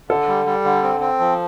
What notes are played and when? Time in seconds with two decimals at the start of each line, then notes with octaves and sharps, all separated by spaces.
0.09 D3 A4
0.28 G3
0.46 G3
0.64 D3
0.83 C4
1.01 C4
1.20 F3